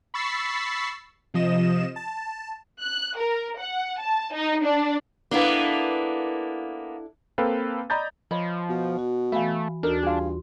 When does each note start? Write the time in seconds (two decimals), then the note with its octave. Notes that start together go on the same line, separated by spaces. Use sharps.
0.14 B5 C#6 E6 A6 B6 C7
1.34 C3 F3 D#5 E7
1.96 A5
2.82 F#6
3.18 A#4
3.60 F#5
3.99 A5
4.34 D#4
4.63 D4
5.31 A#3 B3 D4 E4 A4
7.38 A#3 C4 A4 B4 F5 G5
7.90 D5 D#5 A#5 B5 G6 A6
8.31 F3 C#5 D#5 B5
8.69 B2
8.99 F#4
9.32 E3 A3 E5 F5 G#5 B5
9.83 D#2 D4 D#4 F#4 A4 A#4
10.03 G2 F4 G#4 F5 C6